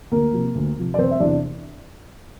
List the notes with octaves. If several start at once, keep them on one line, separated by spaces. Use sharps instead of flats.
D2 A#3 A#4
C3 F3
D2
C3 F3
D5
E1 C4 C5
E5
E2 C3 E3 D4 D5